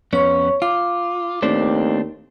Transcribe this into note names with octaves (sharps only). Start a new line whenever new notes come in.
F2 B3 C#4 C#5 C#6
F4 D6
D#2 A3 C4 D4